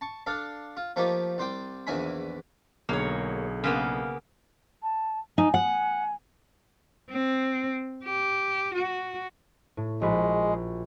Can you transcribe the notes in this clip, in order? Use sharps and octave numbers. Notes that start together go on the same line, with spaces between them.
A5 C#6
D4 A4 F5
F4
F3 A3 A#3 D#4 F4 G4
C2 C5 D5 G5
A#1 E2 D#3 E5 G#5 B5
B1 D3 A#3 G#4 C#5
C#3 A#3 B3
A5
D#4 G#5
F#5
C4
G4
F#4
A2
A#1 G#3 F#4 B5